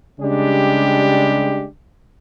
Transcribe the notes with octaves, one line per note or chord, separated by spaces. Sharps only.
C#3 G3 G#3 D4 G4